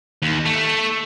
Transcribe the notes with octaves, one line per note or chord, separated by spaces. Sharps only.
D#2
A3